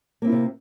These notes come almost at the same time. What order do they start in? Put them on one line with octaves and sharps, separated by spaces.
A#3 C4 E4 F4 C3